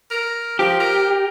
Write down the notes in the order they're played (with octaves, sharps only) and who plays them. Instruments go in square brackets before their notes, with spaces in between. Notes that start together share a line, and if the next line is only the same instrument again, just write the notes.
[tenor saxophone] A#4
[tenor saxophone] F3 [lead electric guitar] G4
[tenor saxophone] A#4